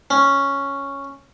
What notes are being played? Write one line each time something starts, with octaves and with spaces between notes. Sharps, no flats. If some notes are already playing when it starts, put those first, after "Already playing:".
C#4